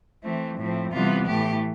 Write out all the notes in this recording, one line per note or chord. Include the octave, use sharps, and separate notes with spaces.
E3 A3 C4
A2 F3 C4
C3 E3 G3 B3 F4
A2 E3 A3 G4